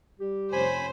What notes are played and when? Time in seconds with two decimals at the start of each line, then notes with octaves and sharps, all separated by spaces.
0.19 G3 G4
0.53 F1 C#4 C5 G#5 B5